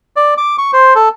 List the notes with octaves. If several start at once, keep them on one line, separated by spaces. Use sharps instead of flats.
D5
D6
C#6
C5
A4